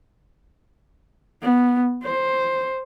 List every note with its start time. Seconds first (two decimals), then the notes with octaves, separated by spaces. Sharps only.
1.42 B3
2.04 C5